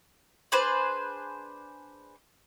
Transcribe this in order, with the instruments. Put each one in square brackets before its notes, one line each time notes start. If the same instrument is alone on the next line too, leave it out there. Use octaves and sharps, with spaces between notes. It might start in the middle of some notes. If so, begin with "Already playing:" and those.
[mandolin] D4 G#4 B4 C5